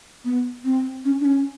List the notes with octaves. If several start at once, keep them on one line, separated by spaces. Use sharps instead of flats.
B3
C4
C#4
D4
C#4